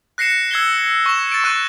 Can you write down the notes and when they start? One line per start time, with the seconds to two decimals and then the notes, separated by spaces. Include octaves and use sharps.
0.18 F#6 A#6 C7 C#7 E7
0.51 E6 G#6 C7 G7
1.06 C#6 E7
1.32 A6 D7
1.44 C#6 F#6 D#7